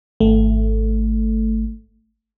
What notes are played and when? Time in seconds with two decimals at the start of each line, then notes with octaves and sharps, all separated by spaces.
0.20 G#1 A3